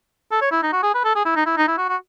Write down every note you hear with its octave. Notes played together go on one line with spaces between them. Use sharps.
A4
C#5
E4
D#4
F#4
G#4
B4
A4
G#4
E4
D#4
E4
D#4
E4
F#4
F#4